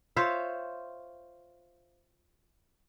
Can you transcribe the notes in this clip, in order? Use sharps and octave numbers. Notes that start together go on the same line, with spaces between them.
F4 C5 C#5 E5